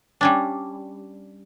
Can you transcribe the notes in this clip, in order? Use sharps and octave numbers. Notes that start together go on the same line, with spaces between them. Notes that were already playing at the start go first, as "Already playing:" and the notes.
G3 C#4 D4